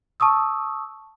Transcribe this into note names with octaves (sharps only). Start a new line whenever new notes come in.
A5 C#6 D#6 E6